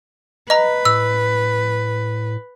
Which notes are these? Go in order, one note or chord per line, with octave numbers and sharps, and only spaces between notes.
B4 D#5 A#5
A2 E6